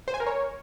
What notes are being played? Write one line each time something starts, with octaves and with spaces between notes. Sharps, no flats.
C5
G#5
A#4
C#5